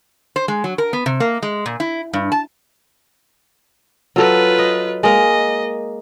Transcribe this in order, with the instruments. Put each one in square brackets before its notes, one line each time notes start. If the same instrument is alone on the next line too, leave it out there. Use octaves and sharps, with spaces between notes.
[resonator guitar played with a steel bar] C5
G#3
F#3
A#4
B3
C3
A#3
G#3
A#2
E4
G2
A5
[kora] F#3 A4 [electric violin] F4 B4
[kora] D#5
[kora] G#3 A#3 [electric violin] D#5